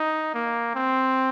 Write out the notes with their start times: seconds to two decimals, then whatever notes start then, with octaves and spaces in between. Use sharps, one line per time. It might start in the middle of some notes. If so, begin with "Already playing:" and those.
Already playing: D#4
0.34 A#3
0.75 C4